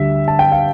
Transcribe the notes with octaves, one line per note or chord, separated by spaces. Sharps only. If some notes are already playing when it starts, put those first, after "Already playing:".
Already playing: D2 D3 G3 E5
A5
G5
F5